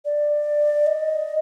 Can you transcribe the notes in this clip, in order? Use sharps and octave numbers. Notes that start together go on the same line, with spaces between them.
D5
D#5